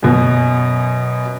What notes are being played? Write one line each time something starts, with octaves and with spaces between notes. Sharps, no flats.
F#2 B2